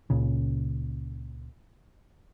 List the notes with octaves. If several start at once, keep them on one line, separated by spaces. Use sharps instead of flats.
C#2 A#2 C#3